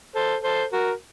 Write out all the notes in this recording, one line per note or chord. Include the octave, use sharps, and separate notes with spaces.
A4 C5
A4 C5
F#4 A#4